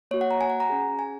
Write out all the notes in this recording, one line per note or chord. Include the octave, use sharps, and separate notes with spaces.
A#3 F#4 C#5
F#5
A#5
G#5
F#5
A#5
C#4 G#4
G#5